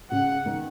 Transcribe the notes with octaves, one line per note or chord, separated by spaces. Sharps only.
C#3 F#5
D#3